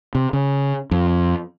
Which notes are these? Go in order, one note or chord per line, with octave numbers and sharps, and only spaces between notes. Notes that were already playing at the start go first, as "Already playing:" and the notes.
C3
C#3
F2